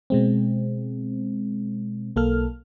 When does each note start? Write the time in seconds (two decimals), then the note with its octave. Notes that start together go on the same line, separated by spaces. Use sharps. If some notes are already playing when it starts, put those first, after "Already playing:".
0.10 B2 G#3 C4
2.16 B1 A#3 A4 F6